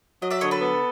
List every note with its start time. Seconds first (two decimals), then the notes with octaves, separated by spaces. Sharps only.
0.21 F#3 D#5
0.30 D5 E5
0.41 D3 C#5 D#5
0.51 A4 B4
0.61 B3